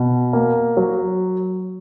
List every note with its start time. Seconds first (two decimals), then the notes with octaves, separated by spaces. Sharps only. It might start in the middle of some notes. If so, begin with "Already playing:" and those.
Already playing: B2
0.33 A#3
0.77 F#3